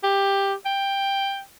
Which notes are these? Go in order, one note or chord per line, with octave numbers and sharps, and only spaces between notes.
G4
G5